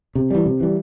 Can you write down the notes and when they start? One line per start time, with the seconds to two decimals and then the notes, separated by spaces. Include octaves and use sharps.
0.15 C3
0.31 E3 G3
0.45 C3
0.60 E3 G3